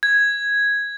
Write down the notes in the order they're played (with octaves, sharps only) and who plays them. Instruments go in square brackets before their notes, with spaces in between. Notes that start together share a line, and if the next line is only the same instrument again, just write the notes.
[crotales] G#6